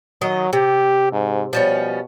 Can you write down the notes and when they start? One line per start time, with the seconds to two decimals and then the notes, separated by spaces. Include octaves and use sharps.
0.21 D#3 F#3 D#5
0.53 C3 G4
1.12 G#2
1.53 B2 F3 G3 C#4